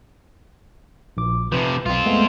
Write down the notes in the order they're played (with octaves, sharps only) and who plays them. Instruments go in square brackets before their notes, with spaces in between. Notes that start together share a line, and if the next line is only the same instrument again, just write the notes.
[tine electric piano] A#1 D6
[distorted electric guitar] C3 F3 [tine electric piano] B4
[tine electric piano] B1 [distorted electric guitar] C4 F4
[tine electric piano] G#3 A3 B3